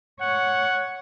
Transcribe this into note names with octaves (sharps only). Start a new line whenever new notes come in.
C#5 F#5